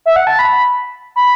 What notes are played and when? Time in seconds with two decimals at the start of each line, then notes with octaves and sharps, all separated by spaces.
0.06 E5
0.16 F#5
0.27 A5
0.39 B5
1.16 B5